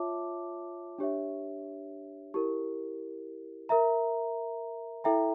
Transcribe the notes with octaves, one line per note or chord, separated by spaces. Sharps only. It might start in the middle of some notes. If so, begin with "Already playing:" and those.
Already playing: F4 C#5 E5 A5 D6
D4 G4 C#5 E5
E4 G4 A#4
A#4 E5 A#5
E4 A4 E5 G5 A#5